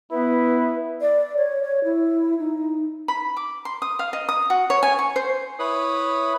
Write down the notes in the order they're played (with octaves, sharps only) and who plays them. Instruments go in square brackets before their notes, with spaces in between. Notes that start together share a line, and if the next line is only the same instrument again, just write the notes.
[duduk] B3 [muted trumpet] E4 [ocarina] B4
[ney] D5
C#5
C#5
E4
D#4
[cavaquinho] B5
D6
C6
D#6
F5
D#5
D#6
F#4
C#5
G#5
C#6
C5
[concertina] E4 B4 C#5 B5 D#6